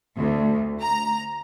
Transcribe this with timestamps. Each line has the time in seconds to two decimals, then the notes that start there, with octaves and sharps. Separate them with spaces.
0.18 D2
0.81 A#5